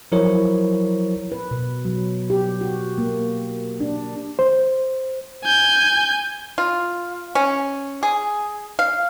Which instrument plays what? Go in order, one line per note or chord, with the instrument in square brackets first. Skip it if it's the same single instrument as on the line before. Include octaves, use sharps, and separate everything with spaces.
[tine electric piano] F3 F#3 E4 A#4 C5 C#5
[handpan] B4
B2
F#3
G4
F#4
A#3
D4
[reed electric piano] C5
[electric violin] G#5 G6
[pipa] F4
C#4
G#4
F5